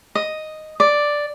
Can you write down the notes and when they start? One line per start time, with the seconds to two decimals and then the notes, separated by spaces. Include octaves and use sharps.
0.15 D#5
0.80 D5